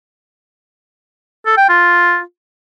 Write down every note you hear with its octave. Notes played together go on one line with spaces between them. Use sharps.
A4
G5
F4